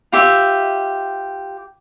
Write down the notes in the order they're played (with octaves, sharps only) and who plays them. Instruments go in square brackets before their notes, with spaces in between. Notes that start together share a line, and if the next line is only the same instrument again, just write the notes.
[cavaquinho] F4 G4 E5